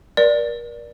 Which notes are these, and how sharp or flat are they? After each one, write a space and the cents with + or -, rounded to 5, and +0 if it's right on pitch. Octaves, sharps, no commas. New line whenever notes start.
A#4 +35 D5 +0